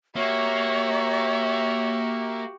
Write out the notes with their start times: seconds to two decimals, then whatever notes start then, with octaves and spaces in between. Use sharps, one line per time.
0.16 A#3 F#4 G4 C#5 E5